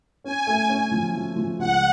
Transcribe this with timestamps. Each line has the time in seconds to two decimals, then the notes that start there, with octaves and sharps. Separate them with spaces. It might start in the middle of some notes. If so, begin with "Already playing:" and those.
0.24 C#4 G#5
0.47 A3
0.69 C#4
0.91 F3
1.14 F3
1.36 F3
1.59 C#2 F#5